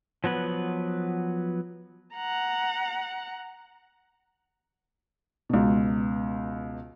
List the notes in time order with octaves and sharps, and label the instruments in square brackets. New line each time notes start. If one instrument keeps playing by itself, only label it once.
[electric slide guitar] F3 F#3 B3 B4
[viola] F#5 A#5
[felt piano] C#2 B2